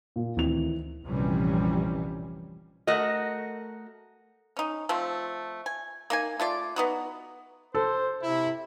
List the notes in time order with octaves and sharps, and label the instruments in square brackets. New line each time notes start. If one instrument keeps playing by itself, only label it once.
[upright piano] A#2
[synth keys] D2 D#3 C4 [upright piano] E3 F7
[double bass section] F1 A#1 C3 E3 G3 C#4
[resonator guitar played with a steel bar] A3 F#4 A#4 D#5
[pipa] C#4 D#4
F3 A3 C4
G#5
A#3 D#4 G#5
A3 F4 D5
B3 D#4 F#4
[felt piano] A4 [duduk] C5
[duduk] C3 [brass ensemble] E4